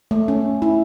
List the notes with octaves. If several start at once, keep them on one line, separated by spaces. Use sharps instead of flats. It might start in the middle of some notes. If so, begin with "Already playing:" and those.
A3
C#4
E4